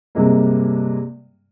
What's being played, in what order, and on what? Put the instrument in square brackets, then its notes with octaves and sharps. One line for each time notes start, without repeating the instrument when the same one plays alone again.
[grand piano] G2 C3 G#3 A#3